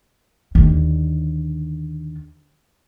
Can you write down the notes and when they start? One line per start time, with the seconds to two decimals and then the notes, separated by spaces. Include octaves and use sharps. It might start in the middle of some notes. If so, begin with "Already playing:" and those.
0.55 D#2 D3